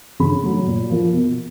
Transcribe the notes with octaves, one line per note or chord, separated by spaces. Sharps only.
C#3 B5
F#3 A3
A#2
F3 A#3
B2